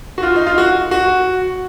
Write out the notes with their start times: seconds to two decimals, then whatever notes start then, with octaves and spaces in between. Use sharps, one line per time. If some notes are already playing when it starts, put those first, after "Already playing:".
0.18 F#4
0.23 F4
0.36 D#4
0.47 F4
0.58 F#4
0.91 F#4